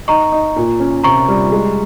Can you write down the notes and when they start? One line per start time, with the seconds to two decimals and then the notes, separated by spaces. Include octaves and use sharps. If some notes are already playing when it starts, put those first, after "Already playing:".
0.08 D#4 A#5 C#6
0.32 D#4
0.56 A#2
0.80 C#4
1.04 C3 A#5 C#6
1.28 G3
1.52 G#3